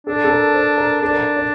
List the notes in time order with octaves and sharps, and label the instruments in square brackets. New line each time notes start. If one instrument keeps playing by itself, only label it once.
[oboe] D4 [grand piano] A4
[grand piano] A4
A#4
C5
A#4
[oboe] D4 [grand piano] A4
[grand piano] A#4
D5